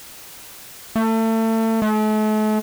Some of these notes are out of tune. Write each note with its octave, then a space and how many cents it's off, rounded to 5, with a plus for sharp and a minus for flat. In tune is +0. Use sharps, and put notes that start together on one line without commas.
A3 +30
A3 -40